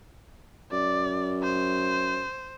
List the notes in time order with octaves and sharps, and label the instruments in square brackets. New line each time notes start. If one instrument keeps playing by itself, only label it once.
[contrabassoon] F#2 [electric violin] D5
[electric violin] C5